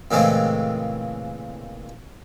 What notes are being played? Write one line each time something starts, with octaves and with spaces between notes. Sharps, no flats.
A#2 C#3 E3 G#3 A3 C4